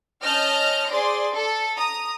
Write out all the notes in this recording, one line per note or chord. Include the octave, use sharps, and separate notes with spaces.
C#4 D#5 A5 F6 G6 A#6
G#4 C5 D5 C6
A4
A#5 D#6